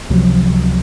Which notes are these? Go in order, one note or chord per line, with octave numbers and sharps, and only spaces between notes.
C#2 C3 F3 F#3